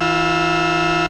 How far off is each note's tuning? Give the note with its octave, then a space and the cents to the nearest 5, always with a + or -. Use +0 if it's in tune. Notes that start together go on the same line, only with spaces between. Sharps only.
E3 -25 F4 +20 E6 +0